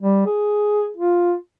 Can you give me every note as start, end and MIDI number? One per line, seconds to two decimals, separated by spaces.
0.02 0.24 55
0.26 0.90 68
0.97 1.35 65